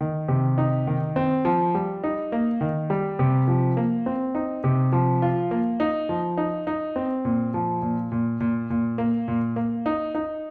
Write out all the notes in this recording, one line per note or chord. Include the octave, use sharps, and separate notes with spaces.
D#3
C3
D#4
D#3
C4
F3
G3
D#4
A#3
D#3
G3
C3
F3
A#3
C4
D#4
C3
F3
F4
A#3
D#4
F3
D#4
D#4
C4
A#2
F3
A#2
A#2
A#2
A#2
A#3
A#2
A#3
D#4
D#4